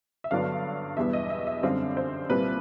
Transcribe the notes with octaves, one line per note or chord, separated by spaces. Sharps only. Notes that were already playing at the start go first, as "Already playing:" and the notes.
E5
G2 D3 F#3 B3 D4 F5
E2 B2 G3 B3 E5
D#5
E5
E5
F#2 D3 G3 C4 F5
C5
C2 A#2 G3 C4 B4